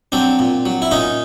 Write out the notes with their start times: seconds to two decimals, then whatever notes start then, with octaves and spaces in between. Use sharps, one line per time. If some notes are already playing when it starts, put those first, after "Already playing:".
0.12 F#3 C4 D4
0.39 A#2
0.66 F#3
0.82 E4
0.91 A#2 C#4 D#4